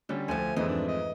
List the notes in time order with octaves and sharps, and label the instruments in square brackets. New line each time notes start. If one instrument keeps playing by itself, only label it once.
[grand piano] D3 G3 C#4 [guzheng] G4
[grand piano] D2 [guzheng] F3 A3 [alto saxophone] G#5
[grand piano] F2 G#2 [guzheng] E3 [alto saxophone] D#5
[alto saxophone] D4
D#5